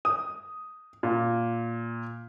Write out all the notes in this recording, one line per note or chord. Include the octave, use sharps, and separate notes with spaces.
D#6
A#2